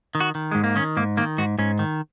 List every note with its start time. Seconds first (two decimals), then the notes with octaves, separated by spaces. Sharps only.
0.15 D#3
0.20 F#4
0.35 D#3
0.51 G#2 G#3
0.64 A#3
0.76 D#3 C#4
0.97 G#2 A#3
1.17 D#3 A#3
1.38 G#2 F#4
1.58 G#2 C#4
1.79 D#3